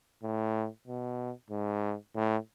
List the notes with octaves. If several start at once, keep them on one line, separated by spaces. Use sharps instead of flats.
A2
B2
G#2
A2